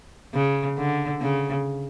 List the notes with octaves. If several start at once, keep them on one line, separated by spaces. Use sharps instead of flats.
C#3
D3
C#3